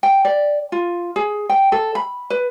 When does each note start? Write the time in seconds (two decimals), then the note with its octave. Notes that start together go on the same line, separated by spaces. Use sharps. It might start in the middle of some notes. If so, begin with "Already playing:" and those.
0.03 G5
0.25 D5
0.72 F4
1.16 G#4
1.49 G5
1.72 A4
1.95 B5
2.30 B4